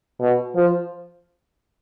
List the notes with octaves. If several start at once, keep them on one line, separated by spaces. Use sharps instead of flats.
B2
F3